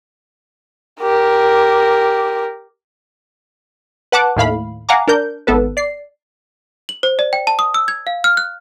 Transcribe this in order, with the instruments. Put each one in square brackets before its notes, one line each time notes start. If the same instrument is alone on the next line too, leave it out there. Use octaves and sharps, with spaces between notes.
[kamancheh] G4 A#4
[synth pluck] B4 F#5 A5 D6 F#6
D#2 A2 F5 B5
F5 F#5 G#5 A#5 D6
D4 A#4 G6
G#1 B3 A4 B4
D5 C7
[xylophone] F#7
C5
D5
G5
A5
D#6
E6
G#6
F5
F6
F#6